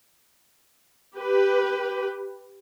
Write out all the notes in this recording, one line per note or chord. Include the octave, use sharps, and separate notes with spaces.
G4 B4